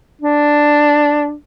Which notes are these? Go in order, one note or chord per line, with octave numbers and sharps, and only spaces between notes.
D4